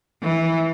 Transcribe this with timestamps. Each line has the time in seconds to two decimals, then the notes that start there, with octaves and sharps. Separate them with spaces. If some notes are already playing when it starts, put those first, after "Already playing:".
0.23 E3